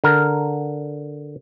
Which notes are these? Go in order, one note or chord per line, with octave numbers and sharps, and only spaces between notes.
D3 A#4